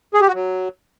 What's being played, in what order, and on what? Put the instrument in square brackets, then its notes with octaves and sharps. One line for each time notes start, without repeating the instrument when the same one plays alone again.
[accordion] G#4
G4
F#4
F#3